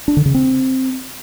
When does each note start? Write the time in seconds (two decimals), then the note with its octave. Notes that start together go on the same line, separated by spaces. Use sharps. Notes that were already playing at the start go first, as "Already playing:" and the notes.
0.08 D4
0.17 D3
0.26 C#3
0.34 C4